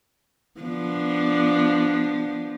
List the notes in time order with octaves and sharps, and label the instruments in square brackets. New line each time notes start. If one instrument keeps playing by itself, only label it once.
[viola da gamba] F3 B3 D4